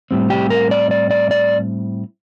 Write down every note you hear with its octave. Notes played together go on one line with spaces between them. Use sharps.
A2 G3 C4
G4
A#4
D5
D5
D5
D5